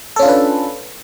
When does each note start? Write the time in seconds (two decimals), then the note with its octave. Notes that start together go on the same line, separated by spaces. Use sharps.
0.16 A4
0.19 C#4
0.22 F4
0.25 D4
0.29 B4